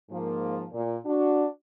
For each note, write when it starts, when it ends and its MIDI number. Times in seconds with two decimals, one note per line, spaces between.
0.10 0.64 44
0.10 0.64 53
0.10 0.64 58
0.71 0.95 46
1.05 1.45 62
1.05 1.45 66